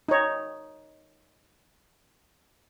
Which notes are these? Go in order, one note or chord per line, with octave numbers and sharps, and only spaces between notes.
D#4 C#5